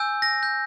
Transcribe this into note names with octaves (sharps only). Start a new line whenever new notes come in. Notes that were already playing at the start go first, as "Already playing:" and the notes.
Already playing: G#5 E6 G6
A#6
G6